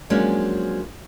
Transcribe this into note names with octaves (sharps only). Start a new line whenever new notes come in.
F3 F#3 G#3 A#3 C#4 D4